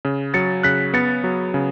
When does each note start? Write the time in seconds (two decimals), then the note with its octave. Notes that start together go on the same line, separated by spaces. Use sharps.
0.05 C#3
0.34 F#3 A6 C#7
0.63 C#3 F#6 B6
0.94 B3 A6 C#7
1.24 F#3
1.54 C#3